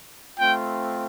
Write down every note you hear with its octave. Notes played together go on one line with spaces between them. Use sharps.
A3 C4 F4 G5